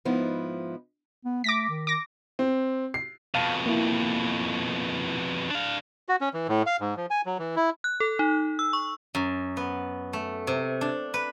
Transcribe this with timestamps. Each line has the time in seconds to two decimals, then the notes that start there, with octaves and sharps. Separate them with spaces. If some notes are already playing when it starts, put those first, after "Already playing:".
0.05 G#2 F3 B3 D#4 E4
1.25 B3
1.44 A3 D6 A#6 B6
1.69 D#3
1.87 D6 A#6
2.39 C4
2.94 C7
3.35 F2 B2 F5 A5
3.66 A#3 E4
5.51 D4 F5
6.09 F#4
6.21 C#4
6.34 E3
6.48 A2
6.66 F5
6.80 G#2
6.97 F3
7.10 G#5
7.26 F#3
7.39 E3
7.56 E4
7.84 F#6
8.00 A4
8.19 D#4
8.59 E6
8.73 C#6
9.15 F#2
9.57 B3
10.13 A3
10.47 C3
10.81 D4
11.14 B4